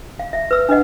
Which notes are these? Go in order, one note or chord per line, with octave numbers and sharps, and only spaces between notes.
F5
E5
B4 E6
D4 B4 D#5 F#5